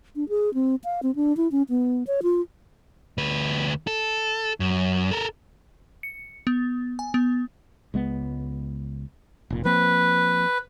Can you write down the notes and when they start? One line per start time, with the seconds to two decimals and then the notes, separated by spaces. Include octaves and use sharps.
0.16 D4
0.29 G#4
0.54 C4
0.84 F5
1.03 C4
1.16 D4
1.37 E4
1.52 C#4
1.69 B3
2.07 C#5
2.23 F4
3.18 D2 B4
3.87 A4
4.60 F#2
5.11 A4 A#4
6.03 C#7
6.47 B3
6.99 G#5
7.14 B3
7.94 C#2 G#3 B3
9.50 F1 A#2
9.65 F3 A#3 C4 B4